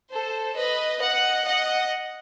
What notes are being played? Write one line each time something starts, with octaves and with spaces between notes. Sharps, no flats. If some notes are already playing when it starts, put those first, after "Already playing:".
A4 C5
B4 D#5
D#5 F#5
D#5 F#5